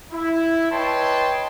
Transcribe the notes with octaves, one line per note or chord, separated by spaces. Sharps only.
E4
B4 C#5 D#5 G5 A5 C6